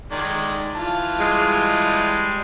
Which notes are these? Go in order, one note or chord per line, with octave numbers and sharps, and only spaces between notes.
D#3 G#3 D5
E3 F4 A5
G3 G#3